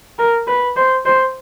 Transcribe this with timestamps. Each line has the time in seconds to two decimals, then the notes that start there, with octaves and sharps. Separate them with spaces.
0.19 A#4
0.47 B4
0.76 C5
1.05 C5